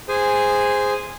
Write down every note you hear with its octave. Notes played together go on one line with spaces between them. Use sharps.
G#4 C5 G#5